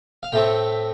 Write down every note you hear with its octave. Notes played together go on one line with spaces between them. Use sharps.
F5
A2 A3 C4 G5